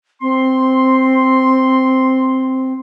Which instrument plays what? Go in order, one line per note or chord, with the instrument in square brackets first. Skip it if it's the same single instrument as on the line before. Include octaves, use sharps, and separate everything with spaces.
[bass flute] C4 [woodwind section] C6